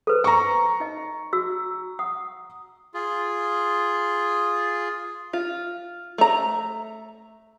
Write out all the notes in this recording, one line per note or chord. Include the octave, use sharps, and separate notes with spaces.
A4 B4 C5
A#5 C#6
D#4 D#5
F#4 E6
F#5 D#6
F4 G#4
F4
A3 A#5